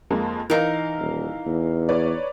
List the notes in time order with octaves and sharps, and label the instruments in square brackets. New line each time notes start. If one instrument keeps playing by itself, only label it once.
[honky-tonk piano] F2 G#3 A#3
[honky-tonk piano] E3 F5 A#6 [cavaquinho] D#4 A#4
[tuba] D#1
E2
[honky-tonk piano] B4 C#5 D5